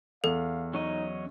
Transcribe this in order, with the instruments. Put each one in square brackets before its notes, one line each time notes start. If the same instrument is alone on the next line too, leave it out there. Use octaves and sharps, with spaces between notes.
[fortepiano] E2 [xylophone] A4 [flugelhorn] F5
[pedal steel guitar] F#3 C#4 D#5 [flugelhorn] D#4